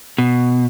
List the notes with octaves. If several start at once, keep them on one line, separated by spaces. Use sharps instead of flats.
B2